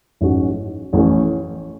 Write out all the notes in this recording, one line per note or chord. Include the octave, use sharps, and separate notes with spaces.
A1 G#2 F#3 C#4 F#4
A1 A2 E3 A3 C#4